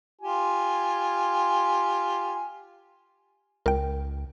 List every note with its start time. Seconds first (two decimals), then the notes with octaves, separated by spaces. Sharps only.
0.21 F4 G4 G#5
3.66 C#2 A#4 G5